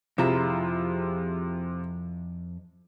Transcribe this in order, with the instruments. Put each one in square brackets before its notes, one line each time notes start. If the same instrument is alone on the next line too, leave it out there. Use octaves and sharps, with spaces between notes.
[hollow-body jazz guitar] F2 E4 A#5 [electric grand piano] C3 F4 G#4